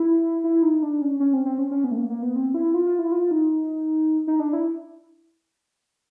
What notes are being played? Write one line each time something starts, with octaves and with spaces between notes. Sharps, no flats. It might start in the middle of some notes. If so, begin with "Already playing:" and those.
Already playing: E4
E4
D#4
D4
C#4
C#4
C4
C4
C#4
C#4
B3
A3
A#3
A#3
B3
C4
E4
F4
F4
E4
F4
D#4
D#4
D4
E4